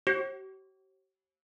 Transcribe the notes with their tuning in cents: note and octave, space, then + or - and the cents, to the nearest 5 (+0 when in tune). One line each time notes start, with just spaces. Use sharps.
G4 -45 C#5 -45